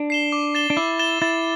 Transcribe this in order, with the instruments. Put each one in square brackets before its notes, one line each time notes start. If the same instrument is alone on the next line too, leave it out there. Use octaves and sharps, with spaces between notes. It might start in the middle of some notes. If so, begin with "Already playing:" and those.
Already playing: [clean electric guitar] D4
[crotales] C7 E7 G7
D6
A6 E7 G7
[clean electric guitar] D4
[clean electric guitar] E4 [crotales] D6
[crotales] A6 E7 G7
[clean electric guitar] E4 [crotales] A6